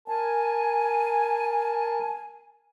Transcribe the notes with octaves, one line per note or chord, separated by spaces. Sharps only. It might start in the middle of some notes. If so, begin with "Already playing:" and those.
A#4 G#5 A5